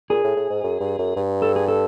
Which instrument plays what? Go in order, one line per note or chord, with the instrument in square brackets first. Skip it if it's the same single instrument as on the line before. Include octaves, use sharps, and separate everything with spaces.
[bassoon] A#2 [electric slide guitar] G#4
[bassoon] A2
A2
G#2
F#2
G2
F#2
G2
[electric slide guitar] A4
G#4
A4